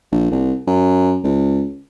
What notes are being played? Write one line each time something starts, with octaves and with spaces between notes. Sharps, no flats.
A#1
C2
F#2
C#2